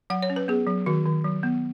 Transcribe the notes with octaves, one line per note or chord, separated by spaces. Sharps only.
F#3 F#5
C#5
C#4
B4
B3 G#4
F#3
D#3 F#4
D#3
F#3
B3